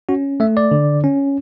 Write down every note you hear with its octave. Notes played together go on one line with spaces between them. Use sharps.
C#4 F#4
A3 E5
D5
D3
C#4